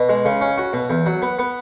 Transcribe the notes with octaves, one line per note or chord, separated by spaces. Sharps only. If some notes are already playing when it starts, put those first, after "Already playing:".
Already playing: B2
G#3
C#3
C#4
F#4
B2
E2
F#3
B3
B3